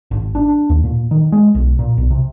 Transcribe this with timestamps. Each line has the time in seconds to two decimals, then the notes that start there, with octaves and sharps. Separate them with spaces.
0.11 G#1
0.35 D4
0.70 D#2
0.84 A#2
1.11 D#3
1.32 G#3
1.55 B1
1.79 A#2
1.98 B1
2.10 C3